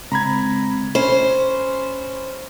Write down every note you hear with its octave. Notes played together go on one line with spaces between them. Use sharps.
C#3 G#3 C4 A#5 B5 G#6
C#4 C5 B5